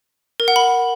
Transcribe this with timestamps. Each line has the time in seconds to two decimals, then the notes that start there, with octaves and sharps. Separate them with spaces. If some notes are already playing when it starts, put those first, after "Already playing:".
0.40 A#4
0.48 F#5
0.56 B5